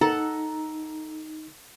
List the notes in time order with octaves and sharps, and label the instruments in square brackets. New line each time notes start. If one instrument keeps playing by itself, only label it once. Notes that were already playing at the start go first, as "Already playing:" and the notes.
[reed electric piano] D#4 [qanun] A4 F#5 [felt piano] A#5